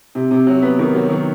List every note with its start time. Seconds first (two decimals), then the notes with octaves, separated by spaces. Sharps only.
0.15 C3
0.31 C3
0.47 F#3
0.62 B3
0.79 D#3
0.95 F#3
1.10 D#3